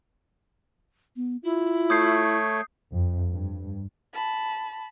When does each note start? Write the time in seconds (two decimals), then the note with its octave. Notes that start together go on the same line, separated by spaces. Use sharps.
1.16 B3
1.43 E4 F4
1.90 A3 C#5 D#6 G6 C7
2.91 F2
3.30 G2
4.13 A5 B5